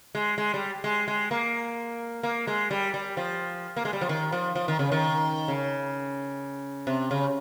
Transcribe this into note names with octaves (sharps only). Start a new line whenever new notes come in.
G#3
G#3
G3
G#3
G#3
A#3
A#3
G#3
G3
G3
F3
A#3
G#3
G3
F3
D#3
F3
F3
D#3
C#3
D#3
C#3
C3
C#3